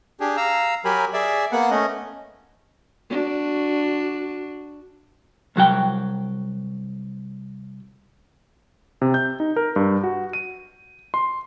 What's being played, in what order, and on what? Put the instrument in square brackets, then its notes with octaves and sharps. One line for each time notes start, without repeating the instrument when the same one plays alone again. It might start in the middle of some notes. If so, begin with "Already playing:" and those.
[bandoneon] D4 G4 G#4
F5 A#5 E6
F#3 G4 A#4 G#5 B5
G#4 D5 E5
A#3 B3 F#5
A3 C#4 D#5
[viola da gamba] D4 F#4
[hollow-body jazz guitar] C2 F#3 F#4 G5
[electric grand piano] C3
G6
D#4
A#4
G2
F#4
D#7
C6